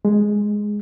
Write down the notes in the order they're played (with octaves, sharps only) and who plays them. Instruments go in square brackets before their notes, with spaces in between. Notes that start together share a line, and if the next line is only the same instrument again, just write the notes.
[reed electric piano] G#3